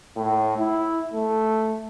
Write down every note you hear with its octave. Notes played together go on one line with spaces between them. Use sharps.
A2
E4
A3